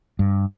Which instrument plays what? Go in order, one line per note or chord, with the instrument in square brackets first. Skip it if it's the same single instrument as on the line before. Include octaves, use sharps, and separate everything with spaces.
[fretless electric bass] G2